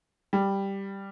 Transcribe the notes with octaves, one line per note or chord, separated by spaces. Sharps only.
G3